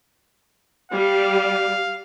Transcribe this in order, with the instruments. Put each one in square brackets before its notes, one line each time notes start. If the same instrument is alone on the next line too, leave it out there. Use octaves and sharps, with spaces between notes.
[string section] G3 [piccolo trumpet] F5